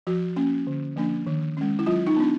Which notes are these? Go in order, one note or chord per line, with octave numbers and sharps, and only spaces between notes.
F3 F#4
A#3 C#4
D3
F3 A#3 D4
D#3
G#3 C#4
E4
F#3 F4
D#4
B3 D4